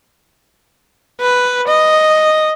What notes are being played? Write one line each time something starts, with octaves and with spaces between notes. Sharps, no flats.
B4
D#5